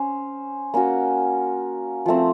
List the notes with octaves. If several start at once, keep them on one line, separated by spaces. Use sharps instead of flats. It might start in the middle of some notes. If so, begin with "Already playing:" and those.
Already playing: C#4 C5
A#3 C#4 F#4
F3 A3 C4